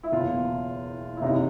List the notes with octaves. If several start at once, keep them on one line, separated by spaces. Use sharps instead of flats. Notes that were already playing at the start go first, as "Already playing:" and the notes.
E4
F#1 E2 B2 F4
E4
F#1 E2 C3 D#4